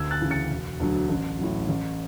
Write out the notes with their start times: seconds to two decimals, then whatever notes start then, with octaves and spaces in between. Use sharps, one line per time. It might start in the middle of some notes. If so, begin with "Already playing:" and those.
Already playing: D2 E6 G#6
0.11 F#6 A6
0.21 C#3 E3
0.31 A6 C#7
0.50 E1
0.80 D2 D3 F#3
1.09 A1
1.39 A2 F#3
1.68 A1